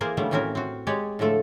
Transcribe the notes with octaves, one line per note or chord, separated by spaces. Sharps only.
E3 A#3 G#4 A#4 C5 D5
C#3 F3 G3 A3 B3 D4
A2 E3 C4 C#4 F#4 A#4
C4 F#4
G#3 G4 C#5 D5
A2 D3 F3 A3 A4